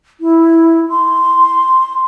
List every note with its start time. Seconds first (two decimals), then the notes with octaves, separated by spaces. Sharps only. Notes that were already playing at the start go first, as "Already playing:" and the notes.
0.21 E4
0.90 C6